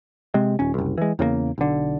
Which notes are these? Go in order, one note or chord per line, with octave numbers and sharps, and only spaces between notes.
C3 G#3 C4
D#1 C#4
F#1 C2
E3 G#3
E2 C#3 G#3 A#3
B1 D3